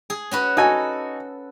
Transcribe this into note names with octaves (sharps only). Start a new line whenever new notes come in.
G#4
C#4 F#4 B4
D#4 F#4 A4 G#5